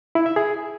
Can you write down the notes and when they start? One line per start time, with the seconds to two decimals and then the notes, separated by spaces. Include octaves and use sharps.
0.15 E4
0.26 E5
0.36 G#4